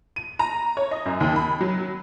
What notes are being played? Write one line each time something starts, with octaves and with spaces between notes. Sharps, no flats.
D#7
A#5
C#5
D#5
F#2
D#2
B5
F#3